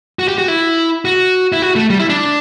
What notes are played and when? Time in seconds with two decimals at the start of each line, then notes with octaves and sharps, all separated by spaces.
0.19 F#4
0.28 G4
0.38 F#4
0.48 E4
1.05 F#4
1.52 E4
1.62 F#4
1.76 A3
1.90 G3
1.99 E4
2.10 D4